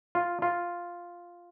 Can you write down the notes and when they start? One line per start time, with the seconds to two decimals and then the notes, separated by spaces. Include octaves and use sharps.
0.15 F4
0.42 F4